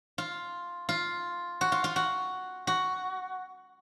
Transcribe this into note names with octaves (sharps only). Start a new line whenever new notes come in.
F4
F4
F#4
F4
F4
F#4
F#4